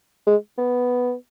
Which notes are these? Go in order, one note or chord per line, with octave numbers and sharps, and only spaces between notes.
G#3
B3